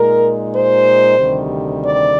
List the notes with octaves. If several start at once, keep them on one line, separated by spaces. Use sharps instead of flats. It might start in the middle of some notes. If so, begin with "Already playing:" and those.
Already playing: A#2 G#3 D#4 A#4
C5
D2 C3 D#3 G3
D5